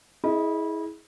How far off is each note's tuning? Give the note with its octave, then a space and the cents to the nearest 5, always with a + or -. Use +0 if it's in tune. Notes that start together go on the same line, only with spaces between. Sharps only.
E4 -25 G#4 +15 D#5 +0